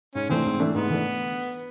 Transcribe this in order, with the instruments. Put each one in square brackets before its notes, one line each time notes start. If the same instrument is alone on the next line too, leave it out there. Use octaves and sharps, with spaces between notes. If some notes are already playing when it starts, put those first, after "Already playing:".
[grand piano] G#2 [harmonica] C#4
[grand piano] E3 A3 D4 [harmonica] C4
[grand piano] G#2
E3 A3 D4
[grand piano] G#2 [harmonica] B3
[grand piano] E3 A3 D4